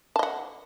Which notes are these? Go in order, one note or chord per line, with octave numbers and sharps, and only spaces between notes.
D#5 F#5 A5